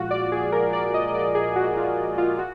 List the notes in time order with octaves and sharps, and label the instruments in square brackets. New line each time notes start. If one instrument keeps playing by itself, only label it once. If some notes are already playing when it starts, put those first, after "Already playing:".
Already playing: [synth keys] A#2 F3 G#3 F4 F#4
D5
G#4
A#4
D5
D#5
D5
G#4
F#4
F4
F4
F#4